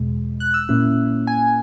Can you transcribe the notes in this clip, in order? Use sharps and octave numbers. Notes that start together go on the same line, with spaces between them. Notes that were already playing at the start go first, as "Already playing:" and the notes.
Already playing: E2 B2 G#3
F#6
E6
A#2 A#3 C#4 E4
G#5